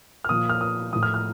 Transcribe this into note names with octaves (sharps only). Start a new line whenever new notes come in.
F6
A#2 F3 D#6
F6
D#6
A2 F3 D#6
F6
F6